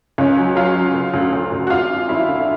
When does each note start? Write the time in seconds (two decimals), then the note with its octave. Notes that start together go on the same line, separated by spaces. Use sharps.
0.18 C#2 C#4
0.37 F#3
0.56 F#3 F4
0.75 F#3
0.94 C#3
1.14 D2
1.33 D2
1.52 D2
1.67 F#4
1.70 G#1 F4
1.90 F#2
2.09 G#1 E4
2.28 D3